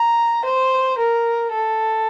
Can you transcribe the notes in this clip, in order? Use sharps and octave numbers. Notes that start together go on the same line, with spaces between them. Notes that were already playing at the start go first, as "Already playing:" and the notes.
Already playing: A#5
C5
A#4
A4